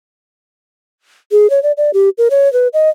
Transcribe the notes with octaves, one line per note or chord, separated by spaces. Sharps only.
G#4
C#5
D5
D5
G4
A#4
C#5
B4
D#5